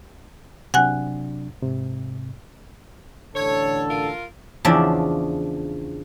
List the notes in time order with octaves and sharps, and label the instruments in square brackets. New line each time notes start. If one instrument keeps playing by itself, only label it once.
[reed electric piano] C3 F#3 D4 [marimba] F#5 G#5 F#6
[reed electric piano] G#2 C3
[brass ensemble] A1 D3 A4 [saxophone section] C#5
[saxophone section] F4 A#4
[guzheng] E2 C#3 F3 D4 E5